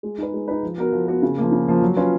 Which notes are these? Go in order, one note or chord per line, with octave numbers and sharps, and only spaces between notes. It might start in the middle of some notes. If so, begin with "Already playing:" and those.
G#3
D#4 G#4 B4
G#3
D#4 G#4 B4
F3
B3 F#4 A#4
F3
B3 F#4 A#4
C#3
F3 A#3
C#3
F3 A#3
F#3
C#4 F4 B4